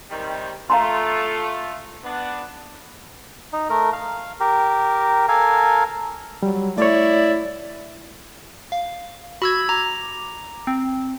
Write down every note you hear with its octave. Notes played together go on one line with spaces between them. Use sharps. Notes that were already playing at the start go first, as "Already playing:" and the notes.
C3 D#3 G3
A3 F4 F5 A#5 C6
B3 D4
D#4
A3 A#4
F5
G4 A#4
A4 A#4 F5 G#5
F#3 G3
A3 E4 C#5 D5
F5
F#4 B5 E6 G#6
A#5 D6
C4